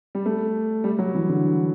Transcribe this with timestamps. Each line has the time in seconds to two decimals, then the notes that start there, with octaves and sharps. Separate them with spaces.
0.15 G3
0.26 A3
0.84 G3
0.99 F#3
1.14 E3
1.29 D3